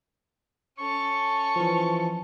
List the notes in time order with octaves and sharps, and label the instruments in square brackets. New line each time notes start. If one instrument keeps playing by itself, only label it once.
[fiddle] C#4 A4 [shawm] C#6
[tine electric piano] E3 F3